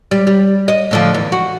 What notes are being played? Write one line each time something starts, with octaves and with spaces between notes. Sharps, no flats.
G3
G3
D#5
A2 D3 F3
E2
F#4